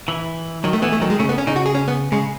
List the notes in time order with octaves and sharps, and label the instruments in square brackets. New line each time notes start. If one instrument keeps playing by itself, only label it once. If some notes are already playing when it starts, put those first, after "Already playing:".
[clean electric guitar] E3
[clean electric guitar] D#3 [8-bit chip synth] F#3
[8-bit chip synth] A3
[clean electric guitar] E3 [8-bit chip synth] B3
[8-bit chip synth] A3
[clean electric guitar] D#3 [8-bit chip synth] F#3
[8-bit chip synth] G#3
[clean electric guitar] C#3 [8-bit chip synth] A3
[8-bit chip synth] B3
C#4
[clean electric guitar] C#3 [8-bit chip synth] D#4
[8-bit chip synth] F#4
G#4
C#4
B3
[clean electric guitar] C#3 [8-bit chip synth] G#3